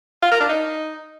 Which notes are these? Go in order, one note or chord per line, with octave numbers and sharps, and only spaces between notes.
F4
A#4
D4
D#4